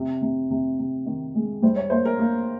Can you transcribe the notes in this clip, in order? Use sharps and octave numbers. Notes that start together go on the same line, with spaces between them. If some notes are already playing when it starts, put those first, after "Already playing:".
Already playing: C3
C3
C3
C3
D#3
G#3
G3 C5
C#5
A#3 C5
A#4
A#3